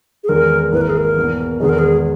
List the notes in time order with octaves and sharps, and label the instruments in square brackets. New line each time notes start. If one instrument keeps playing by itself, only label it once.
[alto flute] G#4
[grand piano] E2 D#3 G#3 [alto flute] A#4
[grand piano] G#1 G#2 E3 A#3 [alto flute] B4
[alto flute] A#4
G#4
A#4
[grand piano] E2 B2 A#3
[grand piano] E1 E2 D#3 G#3 B3 [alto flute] G#4
[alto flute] A#4
G#4